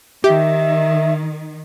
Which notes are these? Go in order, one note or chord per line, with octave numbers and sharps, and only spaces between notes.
D#3 G4 E5